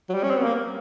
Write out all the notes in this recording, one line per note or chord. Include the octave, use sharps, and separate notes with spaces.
F#3
G3
C#4
C4
B3
A#3